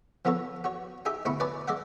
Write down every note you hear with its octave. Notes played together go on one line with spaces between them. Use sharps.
F3 B3 F4 A4 C#5
F#4 C#5
D#4 G4 G#4 E5
D2 B2 E4 B5 C#6
B4 C#5 D5 G#5 A5
G#3 D5 E5 F#5